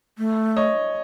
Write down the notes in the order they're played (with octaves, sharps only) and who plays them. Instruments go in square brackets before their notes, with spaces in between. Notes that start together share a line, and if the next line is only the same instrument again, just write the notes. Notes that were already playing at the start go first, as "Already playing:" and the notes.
[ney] A3
[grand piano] C#5 D#5